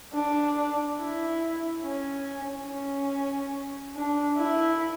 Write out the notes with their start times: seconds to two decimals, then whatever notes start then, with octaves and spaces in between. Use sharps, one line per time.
0.13 D4
0.98 E4
1.83 C#4
2.68 C#4
3.95 D4
4.37 E4